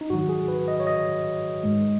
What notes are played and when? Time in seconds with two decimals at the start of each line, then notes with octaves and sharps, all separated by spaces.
0.01 D#4
0.10 G#2 D#3 F#3 F#4
0.29 G#4
0.48 B4
0.68 D#5
0.80 C#5
0.87 D#5
1.64 G#2 G#3